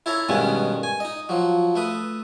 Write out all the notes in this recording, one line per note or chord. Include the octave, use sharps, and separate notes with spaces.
E4 A4 C#5 A#5
G2 B2 D#3 G#3 B3 C#4
G#5
D#4 D#5
F3 F#3
A3 B4 D#6